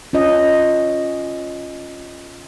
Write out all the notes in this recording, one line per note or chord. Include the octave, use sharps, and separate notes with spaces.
C#4 F4 D#5